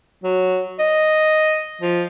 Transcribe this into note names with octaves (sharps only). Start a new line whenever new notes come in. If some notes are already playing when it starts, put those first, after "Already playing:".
F#3
D#5
F3